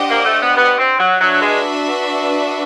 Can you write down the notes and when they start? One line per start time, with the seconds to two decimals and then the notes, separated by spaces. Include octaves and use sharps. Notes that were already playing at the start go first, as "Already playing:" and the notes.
Already playing: D4 G4 C5 D#5 F#5
0.10 A#3
0.25 A3
0.41 B3
0.57 B3
0.78 C4
0.99 F#3
1.20 F#3 D4 F#4 B4 E5
1.41 G#3